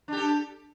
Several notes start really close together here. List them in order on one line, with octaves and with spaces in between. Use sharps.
D4 G4 A4